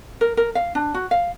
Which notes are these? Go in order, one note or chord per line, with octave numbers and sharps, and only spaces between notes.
A#4
A#4
F5
D4
F#4
F5